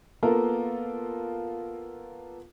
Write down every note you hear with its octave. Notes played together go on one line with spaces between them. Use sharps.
A#3 B3 F4 A4 A#4